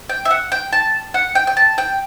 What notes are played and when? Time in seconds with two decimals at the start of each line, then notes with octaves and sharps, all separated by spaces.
0.09 G5
0.25 E5
0.31 F#5
0.52 G5
0.73 A5
1.14 F#5
1.35 G5
1.47 G5
1.57 A5
1.78 G5